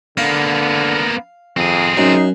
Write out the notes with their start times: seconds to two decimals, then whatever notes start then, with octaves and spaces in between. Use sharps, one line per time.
0.17 D3 A#3 B3 F5
1.57 F2 C4 G#4
1.97 F#2 D#4